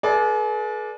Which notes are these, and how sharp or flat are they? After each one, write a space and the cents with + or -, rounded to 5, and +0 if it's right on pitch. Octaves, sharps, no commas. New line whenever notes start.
G#4 +40 B4 -40 D5 +0